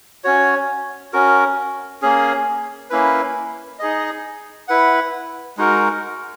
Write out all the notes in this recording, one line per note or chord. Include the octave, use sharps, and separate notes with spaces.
C#4 F#4 C#5
C#4 F#4 A#4
A#3 C#4 G#4
A#3 C#4 E4 B4
D#4 G#4 D#5
E4 B4 F#5
G#3 D#4 F#4 A#4